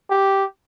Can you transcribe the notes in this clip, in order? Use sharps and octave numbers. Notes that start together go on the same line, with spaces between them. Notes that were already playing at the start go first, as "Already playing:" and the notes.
G4